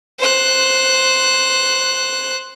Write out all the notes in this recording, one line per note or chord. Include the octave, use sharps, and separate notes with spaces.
C5 F#6